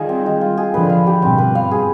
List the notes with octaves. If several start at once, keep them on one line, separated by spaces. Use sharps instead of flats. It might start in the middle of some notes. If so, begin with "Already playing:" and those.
Already playing: D#3 G3 F4 G#4
C4
G#3
F4
G#4
D3 F3 B4
F5
G4
G2 B2 C4
B4
F5
G#4